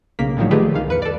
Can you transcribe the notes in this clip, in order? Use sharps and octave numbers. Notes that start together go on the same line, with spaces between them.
B1 C#3 A#3 B6
A2 D3 D#3 F3 F#3
D#3 A3 F4 G4 G#4 B4
C2 D#3 F5
E2 B4 C#7
A4 D5